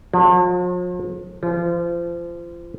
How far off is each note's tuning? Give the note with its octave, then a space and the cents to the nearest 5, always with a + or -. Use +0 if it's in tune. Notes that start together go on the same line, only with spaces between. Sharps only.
F3 +45
F3 -30